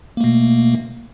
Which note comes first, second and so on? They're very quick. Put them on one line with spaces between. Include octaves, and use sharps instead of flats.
A#3 A3 B2